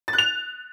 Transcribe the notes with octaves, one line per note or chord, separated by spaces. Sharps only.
A6
F#6
F7